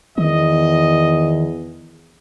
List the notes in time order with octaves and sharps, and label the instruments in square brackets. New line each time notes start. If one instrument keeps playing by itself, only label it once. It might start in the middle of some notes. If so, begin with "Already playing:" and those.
[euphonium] E2 [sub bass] D#3 [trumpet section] D#5